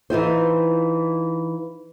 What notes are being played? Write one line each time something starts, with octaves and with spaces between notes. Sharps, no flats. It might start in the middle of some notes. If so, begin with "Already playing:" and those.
E3 D#4 F4 C5